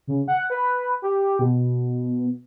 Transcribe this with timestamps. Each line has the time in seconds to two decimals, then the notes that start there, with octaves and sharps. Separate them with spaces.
0.07 C#3
0.28 F#5
0.50 B4
1.02 G4
1.39 B2